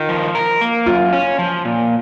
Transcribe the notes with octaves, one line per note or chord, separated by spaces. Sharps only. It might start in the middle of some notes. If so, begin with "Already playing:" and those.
Already playing: D#3 F4
F3
A#4
A#3
F#2 F4
C#4
F3
A#2